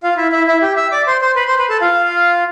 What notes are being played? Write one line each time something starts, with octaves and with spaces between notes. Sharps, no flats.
F4 F5
E4 E5
E4 E5
E4 E5
G4 G5
E5 E6
D5 D6
C5 C6
C5 C6
B4 B5
C5 C6
B4 B5
A4 A5
F4 F5